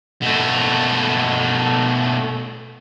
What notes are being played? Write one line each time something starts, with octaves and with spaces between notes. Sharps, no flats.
B2 A3